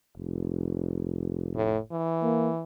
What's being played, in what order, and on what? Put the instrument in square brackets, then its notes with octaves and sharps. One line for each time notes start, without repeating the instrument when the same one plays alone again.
[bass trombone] F1
[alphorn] A2
E3
[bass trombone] A#3